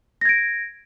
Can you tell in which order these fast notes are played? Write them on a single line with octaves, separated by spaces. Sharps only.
A#6 G#6 D7